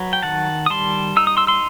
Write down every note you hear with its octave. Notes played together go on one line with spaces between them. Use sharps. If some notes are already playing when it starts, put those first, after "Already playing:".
Already playing: F#3 B4
G5
D#3 F#5 A5
D#6
G3 A5 C6
D#4 E6
D#6
C6 E6
C6 E6